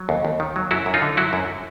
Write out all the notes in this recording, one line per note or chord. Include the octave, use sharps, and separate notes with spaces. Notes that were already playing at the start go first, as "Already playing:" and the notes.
Already playing: F#3
D#2
D#2
D#3
F#3
F#2 E4 F#4
F#2
D#4 F4
D3
F#3 E4 F#4
F#2